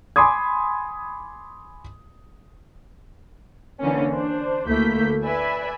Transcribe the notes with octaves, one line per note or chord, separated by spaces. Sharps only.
G#5 B5 C6 D6 D#6 G#6
D3 E3 A#3 C4 C#4
D4 C5
D2 A3 A#3 E4 G6 B6
B4 D5 E5 G#5 B5